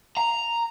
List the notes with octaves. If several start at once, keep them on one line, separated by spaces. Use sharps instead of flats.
A#5